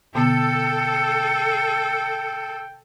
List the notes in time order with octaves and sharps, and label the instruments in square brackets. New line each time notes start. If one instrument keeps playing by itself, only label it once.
[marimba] B2 D3 B3 [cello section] A4 [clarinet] G5